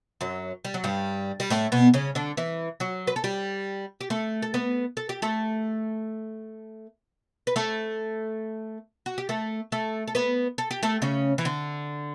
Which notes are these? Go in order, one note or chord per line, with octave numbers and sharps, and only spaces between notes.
F#2 F#3
G3
F#3
G2 G3
G3
A2 A3
B2 B3
C#3 C#4
D3 D4
E3 E4
F#3 F#4
B4
A4
G3 G4
G4
A3 A4
A4
B3 B4
A4
G4
A3 A4
B4
A3 A4
F#4
G4
A3 A4
A3 A4
A4
B3 B4
A4
G4
A3 A4
C#3 C#4
E3
D3